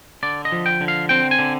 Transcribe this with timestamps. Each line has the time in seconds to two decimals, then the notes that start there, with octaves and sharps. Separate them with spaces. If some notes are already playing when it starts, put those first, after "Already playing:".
0.23 D3 D5
0.45 D#5
0.52 F3
0.66 G5
0.81 D3
0.88 F5
1.09 C4 G5
1.31 G#5
1.39 D3